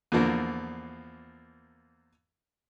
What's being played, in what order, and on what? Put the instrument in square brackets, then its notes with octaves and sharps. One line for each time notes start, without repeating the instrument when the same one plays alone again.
[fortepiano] E2 A#2 D3 F3 A#3